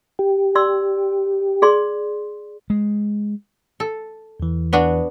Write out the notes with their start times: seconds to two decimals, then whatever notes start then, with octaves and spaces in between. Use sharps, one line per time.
0.19 G4
0.55 D5 C6 E6
1.62 G#4 D5 C6
2.70 G#3
3.80 A4
4.40 E2 E3
4.73 B3 D4 F#4